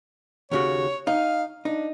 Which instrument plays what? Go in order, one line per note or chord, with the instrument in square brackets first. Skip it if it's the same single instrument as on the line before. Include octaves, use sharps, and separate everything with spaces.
[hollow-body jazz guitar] D#2 C#3 F#4 [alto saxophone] C#5
[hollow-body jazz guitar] D#4 [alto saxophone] F5
[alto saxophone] D4 [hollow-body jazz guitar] D#4